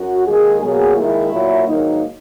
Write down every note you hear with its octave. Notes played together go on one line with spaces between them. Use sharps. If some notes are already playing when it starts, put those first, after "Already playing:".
Already playing: F#2 F#4
D#2 D#3 G#3 G#4
B2 F#3 A#3 G#4
D#2 D#3 G#3 E4
A#2 F#3 A#3
G#2 D#3 F#3 A#3 D#4